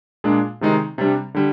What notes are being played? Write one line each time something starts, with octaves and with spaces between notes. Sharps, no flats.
A#2 G#3 D4
C3 D#3 G#3 D#4
C3 G3 D4
D3 G3